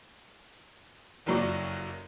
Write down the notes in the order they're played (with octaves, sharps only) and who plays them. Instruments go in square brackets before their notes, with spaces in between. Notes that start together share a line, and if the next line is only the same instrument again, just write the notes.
[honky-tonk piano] F#1 F2 F#3 D5 C#6